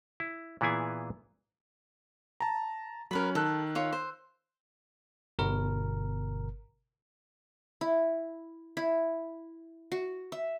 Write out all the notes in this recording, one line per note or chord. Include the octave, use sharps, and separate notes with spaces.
E4
A#2 E3 B3 E4 G#4 G#5
A5 A#5
F#3 C#4 A#4 B4 B5
D#3 A4 E6 F#6
F4 C#5
C5
G1 B2 A#4
E4
E4
F#4
E5